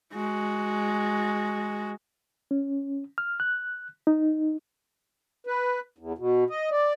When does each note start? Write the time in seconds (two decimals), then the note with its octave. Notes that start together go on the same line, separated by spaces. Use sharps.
0.13 G#3 F#4
2.51 C#4
3.18 F6
3.40 F#6
4.07 D#4
5.47 B4
5.98 E2
6.18 B2
6.50 D#5
6.71 D5